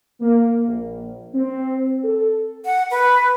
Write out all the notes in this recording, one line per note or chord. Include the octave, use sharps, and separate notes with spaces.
A#3
A#1
C4
A4
F#5
B4